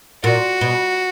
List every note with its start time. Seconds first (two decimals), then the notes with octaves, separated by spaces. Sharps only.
0.24 A#2 F#4
0.61 B2